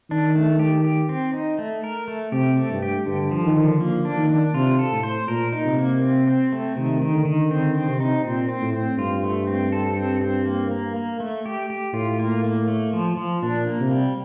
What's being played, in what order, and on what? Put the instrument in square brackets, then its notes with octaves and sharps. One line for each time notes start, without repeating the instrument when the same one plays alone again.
[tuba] D#3 [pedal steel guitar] D4
[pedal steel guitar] A3
G4
G4
C4
D#4
A3
A#4
A3
[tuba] C3 [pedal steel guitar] G4
[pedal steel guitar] A3
[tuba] G2
[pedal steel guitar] G4
[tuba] G2 [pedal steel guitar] D3
[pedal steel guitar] F3
[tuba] D#3
[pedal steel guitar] D3
[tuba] F3 [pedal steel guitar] A#3
[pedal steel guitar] D4
[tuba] D#3
[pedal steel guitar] D4
[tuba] C3 [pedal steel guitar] F4
[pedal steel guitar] A4
[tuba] A2
[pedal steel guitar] C5
[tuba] A#2 [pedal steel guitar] A#4
[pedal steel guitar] D#4
[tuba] C3
[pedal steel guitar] A#3
C4
C4
A3
[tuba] C3 [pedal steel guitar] D#3
[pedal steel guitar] D#3
[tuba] D3
[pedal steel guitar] D#3
[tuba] D3 [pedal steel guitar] C4
[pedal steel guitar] C4
[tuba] C3
[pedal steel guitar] D#4
[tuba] A#2 [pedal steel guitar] C4
[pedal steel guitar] C4
[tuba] A2
[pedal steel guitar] C4
[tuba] G2 [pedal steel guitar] F4
[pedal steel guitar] A3
C4
A4
C4
C4
A#3
A#3
A#3
A3
G4
G4
[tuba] A2 [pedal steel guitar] F4
[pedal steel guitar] A#3
A#3
A3
F3
F3
[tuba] A#2 [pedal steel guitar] D4
[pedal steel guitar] A#3
[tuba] C3
[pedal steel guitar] G3